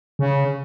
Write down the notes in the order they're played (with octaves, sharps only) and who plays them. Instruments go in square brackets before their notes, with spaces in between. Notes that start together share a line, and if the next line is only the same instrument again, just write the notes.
[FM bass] C#3